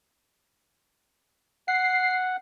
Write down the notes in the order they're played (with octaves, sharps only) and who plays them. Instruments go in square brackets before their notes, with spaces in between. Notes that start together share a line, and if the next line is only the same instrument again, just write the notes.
[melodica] F#5 [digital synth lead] C7